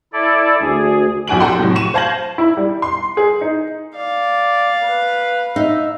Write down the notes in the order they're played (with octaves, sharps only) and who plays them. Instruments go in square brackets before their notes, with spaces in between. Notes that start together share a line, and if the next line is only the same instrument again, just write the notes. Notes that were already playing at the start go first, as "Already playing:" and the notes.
[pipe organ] E4 A4 D5
[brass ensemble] D2 [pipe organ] G#4
[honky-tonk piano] B1 F3 F#4 G#5 D7 F#7
F#4 G4 A4 G5 A#5 C6
A2 C3 F#3
C#6 D#7 E7
C5 F5 A5 G#6 A#6 F#7
E4
G3
C6
G#4
D#4
[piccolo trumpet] D5 [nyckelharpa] F5
[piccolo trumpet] B4
[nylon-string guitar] D#4 [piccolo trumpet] E5